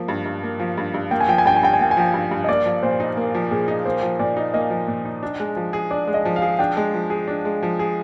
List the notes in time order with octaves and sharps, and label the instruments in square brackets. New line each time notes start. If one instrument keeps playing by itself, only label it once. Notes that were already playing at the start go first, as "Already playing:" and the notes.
Already playing: [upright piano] F3 A#3
G2
G2
A#3
F3
G2
G2
[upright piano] A#3 [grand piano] G5
[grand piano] G#5
[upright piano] F3 [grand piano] G5
[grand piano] G#5
[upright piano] G2 [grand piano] G5
[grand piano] G#5
[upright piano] G2 [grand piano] G5
[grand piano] G#5
[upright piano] A#3 [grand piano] G5
[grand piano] G#5
[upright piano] F3 [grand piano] G5
[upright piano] G2
G2
[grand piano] D#5
[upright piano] A#3 [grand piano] D5
[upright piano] F3
[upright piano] A#2 [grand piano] C5
[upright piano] D#4
[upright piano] A#3 [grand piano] A#4
[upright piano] F3
[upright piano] A#2 [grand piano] G#4
[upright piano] D#4
[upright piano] A#3 [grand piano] C5
[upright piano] F3
[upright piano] A#2 [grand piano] D5
[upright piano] D#4
[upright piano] A#3 [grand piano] D#5
[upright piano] F3
A#2
D#4
D4
G#3
F3
G#4
[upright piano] D4 [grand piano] D5
[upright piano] G#3
[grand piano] D#5
[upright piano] F3
[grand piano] F5
[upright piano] G#4
[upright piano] D4 [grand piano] G5
[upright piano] G#3
F3
G#4
D4
G#3
F3
G#4